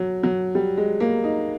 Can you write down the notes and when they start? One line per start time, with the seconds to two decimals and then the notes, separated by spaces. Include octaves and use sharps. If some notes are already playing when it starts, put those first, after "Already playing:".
Already playing: F#3
0.23 F#3
0.55 G3
0.77 G#3
1.00 A#3
1.24 D#4